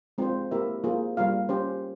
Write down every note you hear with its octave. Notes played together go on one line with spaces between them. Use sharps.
G#3 C4 F4 C5
A#3 E4 G4 A#4 E5
A#3 F4 G#4 C5
G3 A#3 F4 A#4 F5
C#4 G4 C5